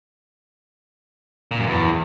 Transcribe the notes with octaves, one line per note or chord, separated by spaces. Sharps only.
A#2
F#2
E2